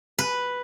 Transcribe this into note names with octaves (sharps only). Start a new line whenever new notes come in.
B4